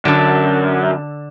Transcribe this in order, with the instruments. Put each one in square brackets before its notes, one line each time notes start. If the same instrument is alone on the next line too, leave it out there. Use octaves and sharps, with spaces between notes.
[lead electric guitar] F#2 [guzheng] D3 A4